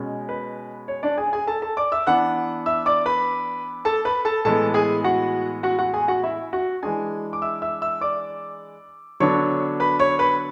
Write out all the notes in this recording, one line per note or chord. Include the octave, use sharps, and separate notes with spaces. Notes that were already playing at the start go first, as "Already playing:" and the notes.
Already playing: B2 G#3 C#4
B4
C#5
D4 D5
G#4 G#5
G#4 G#5
A4 A5
A4 A5
D5 D6
E5 E6
E3 B3 D4 F#5 F#6
E5 E6
D5 D6
B4 B5
A4 A5
B4 B5
A4 A5
A2 E3 G#3 B3 A4 A5
G#4 G#5
F#4 F#5
F#4 F#5
F#4 F#5
G#4 G#5
F#4 F#5
E4 E5
F#4 F#5
E3 G#3 D4 G#4 G#5
D6
E5 E6
E5 E6
E5 E6
D5 D6
D3 F#3 B3 D4 C#5 C#6
B4 B5
C#5 C#6
B4 B5